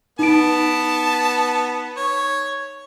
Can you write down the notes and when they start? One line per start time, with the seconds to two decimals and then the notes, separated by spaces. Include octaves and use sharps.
0.19 B3 D#4 A5 D7
1.97 C#5